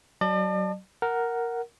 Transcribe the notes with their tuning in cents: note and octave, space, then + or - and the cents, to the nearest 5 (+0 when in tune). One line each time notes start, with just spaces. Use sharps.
F#3 +25 D5 +45 A5 +0
A#4 +0 F#5 +5